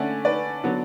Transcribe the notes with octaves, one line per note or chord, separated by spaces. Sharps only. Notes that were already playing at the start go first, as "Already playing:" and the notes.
Already playing: D3 A3 C#4 D5 F#5
B4 D5
D3 F#3 B3